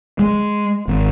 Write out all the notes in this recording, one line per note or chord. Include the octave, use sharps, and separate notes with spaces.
G#3
G#1